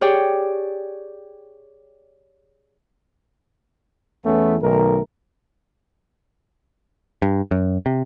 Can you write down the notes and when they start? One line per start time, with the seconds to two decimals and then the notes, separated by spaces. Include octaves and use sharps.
0.01 G4 G#4 C#5 D5 G5
4.25 E2 E3 A3 B3 C#4
4.61 B1 D#3 A3 A#4
7.22 G2
7.51 F#2
7.86 C3